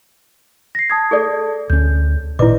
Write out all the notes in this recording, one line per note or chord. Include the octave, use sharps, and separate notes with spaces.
A#6 C7
A5 D#6 G#6
G#4 A4 D5
D2 C#4 G6
G#1 A#2 E4 B4 D5 D#5 D6